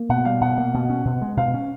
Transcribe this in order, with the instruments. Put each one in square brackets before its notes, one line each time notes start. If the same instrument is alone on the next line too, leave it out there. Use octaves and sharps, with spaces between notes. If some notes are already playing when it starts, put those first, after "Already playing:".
Already playing: [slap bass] A#3
[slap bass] B2 [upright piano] F#5
[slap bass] G3 [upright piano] F5
[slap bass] B2 [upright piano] F#5
[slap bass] A#3
B2
C#4
B2
G#3
[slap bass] B2 [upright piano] F5
[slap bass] C#4